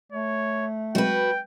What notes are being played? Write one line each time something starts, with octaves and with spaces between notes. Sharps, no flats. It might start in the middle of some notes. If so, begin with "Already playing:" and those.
A3 C#5
F#3 G#3 C4 F#4 B4 G5